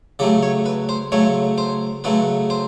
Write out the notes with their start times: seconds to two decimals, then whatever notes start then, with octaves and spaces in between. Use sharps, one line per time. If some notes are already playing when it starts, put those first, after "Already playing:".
0.19 C#3 F#3 A3 G4
0.43 C#5
0.66 B4
0.89 C5
1.12 C#3 F#3 A3 C#5
1.58 C5
2.04 C#3 F#3 A3 B4
2.50 C5